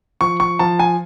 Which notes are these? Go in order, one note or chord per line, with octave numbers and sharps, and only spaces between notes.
F3 C#6
C#6
F3 A5
G#5